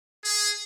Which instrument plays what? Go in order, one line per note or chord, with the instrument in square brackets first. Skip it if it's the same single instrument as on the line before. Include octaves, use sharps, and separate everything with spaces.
[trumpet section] G#4